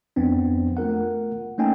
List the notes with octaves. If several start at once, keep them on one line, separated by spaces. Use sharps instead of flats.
F2 B3 C4 D4
A3 F4 A#4 F#5
A3 A#3 C#4 D#4 G5 G#5